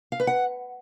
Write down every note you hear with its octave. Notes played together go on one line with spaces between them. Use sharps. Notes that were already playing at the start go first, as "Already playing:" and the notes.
F5
B4
F#5